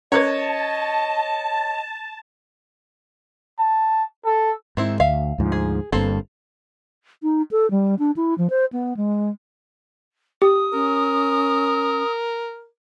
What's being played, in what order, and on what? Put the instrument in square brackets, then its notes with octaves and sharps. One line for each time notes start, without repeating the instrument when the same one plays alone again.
[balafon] C#4 A#4 B4 [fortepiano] C#5 [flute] D#5 [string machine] A5
[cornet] A5
A4
[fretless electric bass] G#2 [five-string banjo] D#3 C4 E4
[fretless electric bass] D2 [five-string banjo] E5 F5
[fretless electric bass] D2 G#2 F3
[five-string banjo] G#4
[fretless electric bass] G1 G2 [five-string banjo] A#3 C4 A4
[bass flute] D#4
A4
G3
D4
E4
F3
C5
B3
G#3
[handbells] G4 [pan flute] D#6
[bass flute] C#4 [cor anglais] A#4